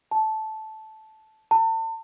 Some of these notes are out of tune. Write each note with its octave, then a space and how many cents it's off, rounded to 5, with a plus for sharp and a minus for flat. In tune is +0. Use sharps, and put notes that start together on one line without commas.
A5 -10
A5 +35